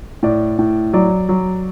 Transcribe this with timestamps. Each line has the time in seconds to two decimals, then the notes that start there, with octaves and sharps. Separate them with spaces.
0.23 A2 D5
0.59 A2
0.93 F#3 D5
1.29 F#3